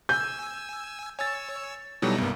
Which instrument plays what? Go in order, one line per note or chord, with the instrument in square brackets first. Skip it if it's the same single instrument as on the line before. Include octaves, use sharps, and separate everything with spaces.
[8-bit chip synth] G#5 E6 [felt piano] G6
[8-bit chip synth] C#5 E6 [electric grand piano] G#5 A6
[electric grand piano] B2 F#3 G3 [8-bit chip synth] D#4 E4 A4
[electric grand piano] C2 A#3 [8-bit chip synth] G2 B3